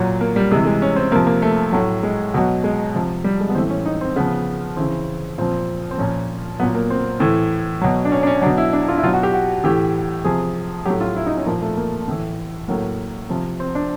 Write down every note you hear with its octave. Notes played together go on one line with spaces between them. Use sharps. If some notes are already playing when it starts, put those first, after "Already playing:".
Already playing: A#2 F#3
A#3
G3
C3 E3 G#3
G#3
C#4
C4
C3 F3 A#3
A#3
A3
A2 F#3
G#3
B2 F#3
G#3
C3 F3
G3
G#3
B3
A2 E3 C4
C#4
D#4
C4
C#3 F3 B3
C#3 E3 C4
A#2 F3 C4
C4
A#2 F3 C#4
A#2 F#3 B3
A#3
C4
A2 E3
B2 F#3
D4
C#4
D4
C#4
B2 F#3 D4
E4
D4
F4
E4
B2 F#3 F4
F#4
G4
F#4
A2 E3 G4
C3 F3 G#4
A2 F#3 G4
F4
E4
D#4
C#4
A#2 F3 A#3
A3
A#3
A2 E3
A2 F#3 A#3
C3 F3
C4
D4